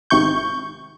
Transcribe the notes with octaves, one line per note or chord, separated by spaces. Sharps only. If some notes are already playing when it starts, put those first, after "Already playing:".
G#1 C3 C#6 G6